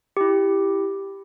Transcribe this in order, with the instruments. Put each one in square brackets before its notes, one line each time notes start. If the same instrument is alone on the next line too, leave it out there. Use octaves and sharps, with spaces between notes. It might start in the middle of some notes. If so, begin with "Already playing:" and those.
[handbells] E4 G4